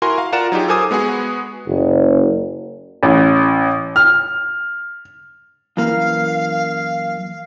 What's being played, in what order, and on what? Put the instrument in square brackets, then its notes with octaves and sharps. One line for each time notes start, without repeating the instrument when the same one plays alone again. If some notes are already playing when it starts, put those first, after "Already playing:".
[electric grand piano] E4 F#4 A#4 G#5 A#5 C6
F5
F4 A#4 D5 F#5 A#5 E7
F#3 D#4 F4 G4 G#4
A4 A#4 C5 G#5 D6 D#6
G#3 B3 F#4 G#4
[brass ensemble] F#1
[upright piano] A1
F6
[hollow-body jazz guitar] F#2 E3 A#3 [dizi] F5